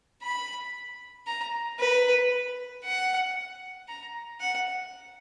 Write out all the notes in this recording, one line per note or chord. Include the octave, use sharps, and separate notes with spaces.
B5
A#5
B4
F#5
A#5
F#5